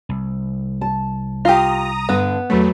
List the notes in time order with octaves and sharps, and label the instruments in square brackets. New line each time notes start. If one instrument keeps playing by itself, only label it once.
[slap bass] C2
[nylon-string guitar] A5
[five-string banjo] F4 G4 [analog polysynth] A#5 D#6
[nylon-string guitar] G2 D3 [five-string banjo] B3
[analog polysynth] E2 A3 [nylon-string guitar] F#3 B4